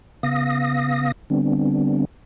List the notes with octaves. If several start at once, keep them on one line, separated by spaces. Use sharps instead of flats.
C#3 B3 F5 D#6 A#6
D3 G3 B3 C4 D4